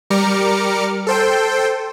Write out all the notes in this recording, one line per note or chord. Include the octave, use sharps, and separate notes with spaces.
G3 A#4 D6 F6 C#7
A4 C5 G5